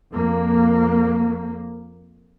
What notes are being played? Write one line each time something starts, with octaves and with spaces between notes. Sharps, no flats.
F2 A#3